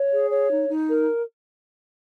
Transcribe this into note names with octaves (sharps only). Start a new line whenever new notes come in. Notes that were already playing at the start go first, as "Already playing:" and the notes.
Already playing: C#5
G#4
C#5
D#4
D#4
A#4